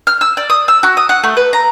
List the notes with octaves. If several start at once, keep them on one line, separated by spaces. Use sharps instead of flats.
F6
E6
D5
D#6
E6
F#4
D#6
F#5
A3
B4
A#5